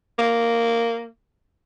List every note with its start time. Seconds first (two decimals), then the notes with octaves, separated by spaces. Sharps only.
0.19 A#3